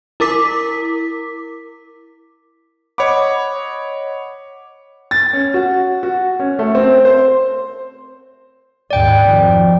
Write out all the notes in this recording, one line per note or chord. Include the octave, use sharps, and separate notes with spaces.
E4 A#4 D6 B6
C#5 D#5 F#5 B5 D6
A6
C#4
F#4
F#4
C#4
A3
C4
C5
D#2 G#2 D5 G5
F2 D#3